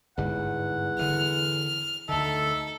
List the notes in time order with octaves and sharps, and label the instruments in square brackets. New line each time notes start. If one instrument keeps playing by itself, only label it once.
[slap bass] G1 G#2 G3 [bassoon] E2 [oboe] F#5
[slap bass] D3 E3 [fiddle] F6
[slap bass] D2 D3 [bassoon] D#4 [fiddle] A4 [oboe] E5